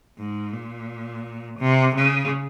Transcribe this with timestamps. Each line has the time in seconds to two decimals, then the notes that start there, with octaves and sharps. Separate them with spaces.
0.18 G#2
0.53 A#2
1.59 C3
1.96 C#3